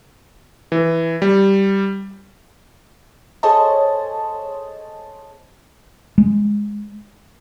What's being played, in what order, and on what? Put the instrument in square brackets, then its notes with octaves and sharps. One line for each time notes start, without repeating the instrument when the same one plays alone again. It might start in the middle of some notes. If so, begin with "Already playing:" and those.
[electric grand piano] E3
G3
[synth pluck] G#4 A4 C5 C#5 D#5 A5
[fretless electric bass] G#3